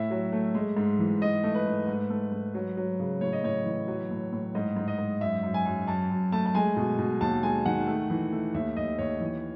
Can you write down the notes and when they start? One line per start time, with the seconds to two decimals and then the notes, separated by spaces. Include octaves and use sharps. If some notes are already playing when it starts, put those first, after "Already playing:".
Already playing: A2 E5
0.11 F#3
0.32 A3
0.55 G#3
0.77 G#2
0.99 E3
1.21 G#2 D#5
1.43 A3
1.55 B4
1.66 G#2
1.87 G#2
2.10 A3
2.32 G#2
2.54 F#3
2.77 F#3
3.00 C#3
3.21 A2 C#5
3.33 D#5
3.44 A2 C#5
3.66 E3
3.88 F#3
4.11 A2
4.33 A2
4.55 G#2 D#5
4.76 G#2
4.88 D#5
4.99 G#2
5.20 F#2 E5
5.43 F#2
5.54 G#5
5.65 F#2
5.88 F#2 A5
6.10 F#2
6.32 A3 A5
6.46 A5
6.54 G#3 G#5
6.77 B2
6.99 B2
7.21 D#2 A5
7.43 G#3 G#5
7.66 D#3 F#5
7.87 A3
8.10 E3
8.32 A3
8.54 D#2 E5
8.76 D#2 D#5
8.99 D#2 C#5
9.21 E3